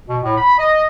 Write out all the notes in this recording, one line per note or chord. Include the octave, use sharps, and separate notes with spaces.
B2
A2
B5
D#5